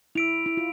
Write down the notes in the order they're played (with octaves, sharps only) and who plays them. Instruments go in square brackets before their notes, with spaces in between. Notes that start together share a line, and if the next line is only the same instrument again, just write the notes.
[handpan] E4 [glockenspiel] E6 B6 D7 F7
[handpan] E4
F4